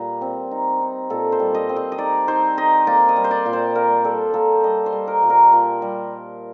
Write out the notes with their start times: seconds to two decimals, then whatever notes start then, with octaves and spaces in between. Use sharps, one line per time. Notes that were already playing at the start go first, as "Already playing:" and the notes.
Already playing: A#2 G3
0.21 C4
0.51 D#4
0.81 D#4
1.10 A#2 A4
1.32 C5
1.40 G3
1.55 D#5
1.69 C4
1.76 D#5
1.92 D#5
1.98 D#4 D5
2.28 D#4 C5
2.57 D#4 D#5
2.87 A#3 D5
3.09 D#5
3.16 G3
3.24 C5
3.31 D5
3.46 A#2
3.53 C5
3.75 A#3 A#4
4.04 G3 A4
4.34 A#3 A4
4.63 G3 D#5
4.86 C5
4.93 G3
5.08 A#4
5.22 A#2
5.30 A#4
5.52 A#2
5.82 G3